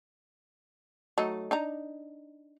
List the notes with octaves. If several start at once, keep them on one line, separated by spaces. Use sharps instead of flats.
F#3 A3 D#4
D4 D#4 A#5